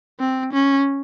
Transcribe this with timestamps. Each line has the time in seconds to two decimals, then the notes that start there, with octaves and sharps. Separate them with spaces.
0.20 C4
0.53 C#4